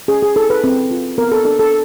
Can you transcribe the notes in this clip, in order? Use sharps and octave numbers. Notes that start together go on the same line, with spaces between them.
C#4 G#4
G#4
E4 A4
B4
C4
F4
B3 A#4
A4
D4 A4
A4